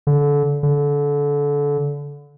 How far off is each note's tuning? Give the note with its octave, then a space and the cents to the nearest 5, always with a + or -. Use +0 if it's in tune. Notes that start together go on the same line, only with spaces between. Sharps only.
D3 -25
D3 -25